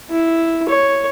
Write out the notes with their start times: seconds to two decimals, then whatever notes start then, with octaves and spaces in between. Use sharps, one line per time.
0.10 E4
0.69 C#5